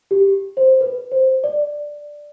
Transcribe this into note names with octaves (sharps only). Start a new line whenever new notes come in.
G4
C5
B4
C5
D5